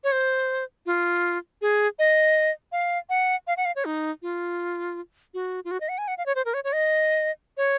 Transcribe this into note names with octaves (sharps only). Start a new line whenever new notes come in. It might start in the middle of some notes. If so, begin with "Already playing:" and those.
C#5
C5
F4
G#4
D#5
F5
F#5
F5
F#5
F5
C#5
D#4
F4
F#4
F4
F#4
D#5
F#5
G#5
F#5
F5
C#5
C5
A#4
C#5
C#5
D#5
C#5